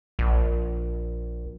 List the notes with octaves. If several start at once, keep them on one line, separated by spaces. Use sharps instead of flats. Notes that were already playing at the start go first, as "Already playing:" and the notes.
A#1